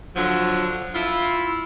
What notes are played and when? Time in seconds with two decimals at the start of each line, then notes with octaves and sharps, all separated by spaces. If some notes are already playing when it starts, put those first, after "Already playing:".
0.16 D3 F3 F#3
0.94 E4 F4